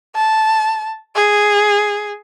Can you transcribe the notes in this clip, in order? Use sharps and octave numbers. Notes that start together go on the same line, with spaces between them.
A5
G#4